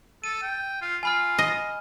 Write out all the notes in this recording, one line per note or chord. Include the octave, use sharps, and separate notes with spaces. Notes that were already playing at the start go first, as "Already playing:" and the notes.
A4 D#7
G5
F4
F4 G#5 B5 F6
D#5